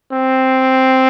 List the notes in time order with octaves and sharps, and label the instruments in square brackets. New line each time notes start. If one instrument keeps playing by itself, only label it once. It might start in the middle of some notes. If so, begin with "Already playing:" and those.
[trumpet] C4